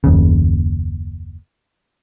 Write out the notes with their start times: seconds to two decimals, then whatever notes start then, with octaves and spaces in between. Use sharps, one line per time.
0.04 F#1 D#2 C#3